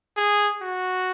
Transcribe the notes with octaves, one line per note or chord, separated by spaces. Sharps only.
G#4
F#4